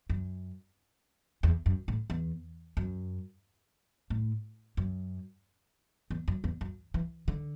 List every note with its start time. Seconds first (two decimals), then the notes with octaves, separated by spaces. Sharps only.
0.10 F#2
1.43 E2
1.66 F#2
1.88 A2
2.10 E2
2.77 F#2
4.10 A2
4.77 F#2
6.10 E2
6.28 F#2
6.44 E2
6.61 F#2
6.94 E3
7.28 D3